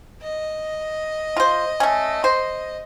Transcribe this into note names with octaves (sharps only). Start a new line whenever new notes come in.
D#5
F4 C5
A3 C#4
C5